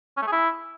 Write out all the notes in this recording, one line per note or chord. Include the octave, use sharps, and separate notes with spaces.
C#4
A3
G#4
E4